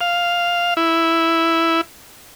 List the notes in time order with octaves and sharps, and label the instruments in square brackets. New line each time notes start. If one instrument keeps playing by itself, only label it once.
[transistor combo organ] F5
E4